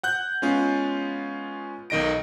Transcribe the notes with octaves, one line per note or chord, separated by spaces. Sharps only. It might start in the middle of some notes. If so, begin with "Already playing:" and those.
F#5 F#6 G6
G#3 B3 C#4 F4
B1 D#3 D#5 A#6 D7